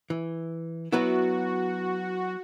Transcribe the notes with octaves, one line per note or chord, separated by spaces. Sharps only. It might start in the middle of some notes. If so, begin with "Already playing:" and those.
E3
F#3 B3 E4 F#4